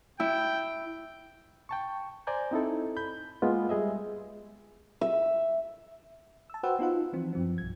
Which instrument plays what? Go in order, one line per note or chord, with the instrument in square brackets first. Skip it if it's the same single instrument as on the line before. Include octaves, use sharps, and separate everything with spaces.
[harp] E4 [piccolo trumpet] G5
[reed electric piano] G5 A5 C#6
C5 D5 G#5 A#5 G6
C4 D#4 E4 A4
B5 G6
G#3 A#3 B3 F4
G3 G#3 G#4 D#5 E5
[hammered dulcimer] E5
[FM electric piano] A5 E6
F#4 B4 C5 F#5 G5 E6
B3 D#4 F4 F#5
E3 F3 C4
F#2 F3 C4
B1 G2 G#6